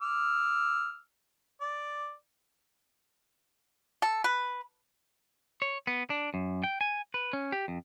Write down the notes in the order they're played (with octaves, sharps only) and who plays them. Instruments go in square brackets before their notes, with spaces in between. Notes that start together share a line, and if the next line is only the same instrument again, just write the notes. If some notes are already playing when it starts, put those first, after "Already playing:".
[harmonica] D6 E6 F6
D5
[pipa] A4
B4
[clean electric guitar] C#5
B3
D4
F#2
G5
G#5
B4
C#4
G4
F2